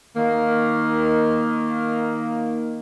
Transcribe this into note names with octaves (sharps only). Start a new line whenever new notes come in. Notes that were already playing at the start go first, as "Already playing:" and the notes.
D#3 A#3